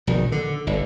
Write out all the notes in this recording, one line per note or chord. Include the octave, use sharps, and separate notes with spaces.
A#1 B2 D#3
D3
G1 D3